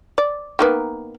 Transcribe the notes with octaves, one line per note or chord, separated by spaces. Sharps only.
D5
D#3 A#3 B3